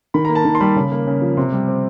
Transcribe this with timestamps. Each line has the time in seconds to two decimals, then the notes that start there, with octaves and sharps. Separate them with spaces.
0.14 D#3 B5
0.25 A#3 A#5
0.35 A5
0.45 D#3 A#5
0.55 C6
0.60 G3 B5
0.76 C#3
0.92 A#3
1.07 C#3
1.22 F3
1.37 C3 C6
1.52 G3
1.68 C4